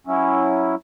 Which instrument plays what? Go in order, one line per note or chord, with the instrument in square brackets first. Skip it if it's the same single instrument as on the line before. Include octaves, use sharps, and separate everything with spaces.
[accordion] F#3 C#4 E4